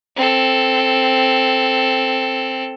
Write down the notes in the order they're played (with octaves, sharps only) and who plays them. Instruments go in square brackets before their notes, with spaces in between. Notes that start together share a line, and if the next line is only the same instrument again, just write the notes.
[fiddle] C4 A4